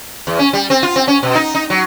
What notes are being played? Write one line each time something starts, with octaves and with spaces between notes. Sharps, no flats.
E2
C#4
G3
C4
F4
C4
C#4
B2
D#4
D#4
F#3